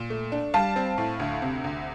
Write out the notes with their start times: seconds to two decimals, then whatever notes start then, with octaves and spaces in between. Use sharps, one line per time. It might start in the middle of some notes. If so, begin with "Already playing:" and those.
Already playing: A#2
0.10 A3
0.32 D4
0.54 G3 F5 A5
0.76 C4
0.98 A2
1.20 D2
1.42 C3
1.64 D2